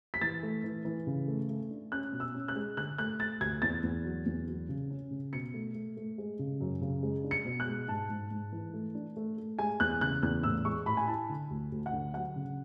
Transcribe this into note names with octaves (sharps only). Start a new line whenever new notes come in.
B6
E3 A6
A3
E3
E3
C#3
A3
A3
D4
C#4 F#6
B2
E6
C#4
F#6
G#3
D3 F#6
A3 F#6
A3 A6
D2 G#6
E2 A6
E2
F#3
E2
F#3
C#3
C#4
C#3
B2 C#7
A3
A3
A3
G#3
C#3
F#2
C#3
G#3
D4
C#7
B2
F#6
G#3
G#2 A5
G#2
G#2
E3
A3
D4
A3
A3
G#3 G#5
E2 F#6
C#3 F#6
E2 F#6
A2 E6
G#3 C#6
A2 B5
G#5
E4 A5
D3
D2
D2
F#5
D3
F#3 F#5
C#3